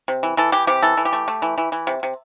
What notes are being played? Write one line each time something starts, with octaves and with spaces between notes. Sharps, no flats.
C3
E3
E3 A4
E3 G4
C3 G4
E3 A4
E3
G4
A3
A3
E3
E3
E3
C3
C3